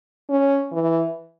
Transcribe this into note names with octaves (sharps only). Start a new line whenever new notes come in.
C#4
E3